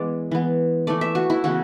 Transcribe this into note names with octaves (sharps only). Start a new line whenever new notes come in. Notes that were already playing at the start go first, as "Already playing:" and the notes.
Already playing: E3 G#3 B3 D5
E3 B3
E3 A3 D5
E5
F#4
E4
C#3 E3 B3 F#4